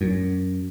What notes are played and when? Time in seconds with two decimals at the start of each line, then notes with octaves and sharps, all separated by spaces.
0.01 F#2